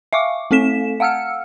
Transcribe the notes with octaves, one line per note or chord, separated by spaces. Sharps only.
E5 F5 C#6 D6
A3 C4 A4 B6 E7
F5 F#5 E6 F6 C#7